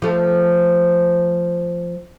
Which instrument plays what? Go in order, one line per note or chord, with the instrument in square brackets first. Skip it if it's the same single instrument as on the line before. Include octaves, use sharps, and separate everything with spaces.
[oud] F3 A3